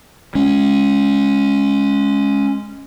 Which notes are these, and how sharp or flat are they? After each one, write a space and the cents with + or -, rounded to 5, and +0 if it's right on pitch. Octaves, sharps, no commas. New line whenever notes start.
G#3 +0 C#4 +0